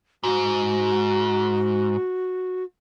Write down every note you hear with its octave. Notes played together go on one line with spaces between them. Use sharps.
G#2 F#4